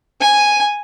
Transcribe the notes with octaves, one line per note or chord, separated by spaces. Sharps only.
G#5